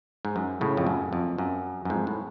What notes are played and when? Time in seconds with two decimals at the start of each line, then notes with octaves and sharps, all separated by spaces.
0.25 G#2
0.36 F#2
0.61 A2 C#3
0.77 F2
0.87 F#2
1.13 F2
1.38 F#2
1.85 F#2
1.90 F2 G#2
2.07 A2